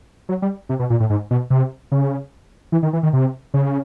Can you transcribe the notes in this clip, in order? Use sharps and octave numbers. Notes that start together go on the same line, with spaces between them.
F#3
G3
C3
B2
A#2
A2
G#2
B2
C3
C#3
E3
D#3
E3
D#3
C3
C#3